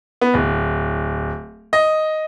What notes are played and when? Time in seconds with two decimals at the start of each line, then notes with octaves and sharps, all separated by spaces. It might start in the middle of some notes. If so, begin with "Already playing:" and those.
0.21 B3
0.34 D1
1.73 D#5